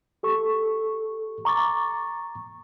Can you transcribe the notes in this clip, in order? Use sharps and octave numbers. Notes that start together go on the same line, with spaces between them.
G4 A4 C#6
A#5 C#6 D6 A6